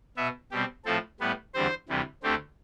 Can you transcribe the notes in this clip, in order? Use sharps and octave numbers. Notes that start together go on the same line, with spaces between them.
B2 B3 E5
B2 G3 C4 G4
A2 F3 C4 A4
A2 G3 B3 B4
E2 D3 G3 C4 C5
D2 C3 E3 G3
D2 D3 A3 C4 G4